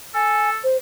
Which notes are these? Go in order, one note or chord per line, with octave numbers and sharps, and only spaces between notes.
A4 G#5
C5